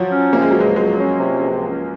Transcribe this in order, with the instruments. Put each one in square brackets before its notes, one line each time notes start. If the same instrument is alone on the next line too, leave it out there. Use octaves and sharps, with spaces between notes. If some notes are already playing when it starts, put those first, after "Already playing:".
Already playing: [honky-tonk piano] F3 [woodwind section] F#3
[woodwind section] C#4
[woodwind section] C3 [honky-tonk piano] A#3
[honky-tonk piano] G#3
F#3
[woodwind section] C#2
[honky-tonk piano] G#3
[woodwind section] F#3 [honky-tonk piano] G#3
[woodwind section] C#4
C3
C#2
C#4